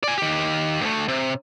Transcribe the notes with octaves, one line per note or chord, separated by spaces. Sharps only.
D5 G#5
D#3 G4
D2 A3
C3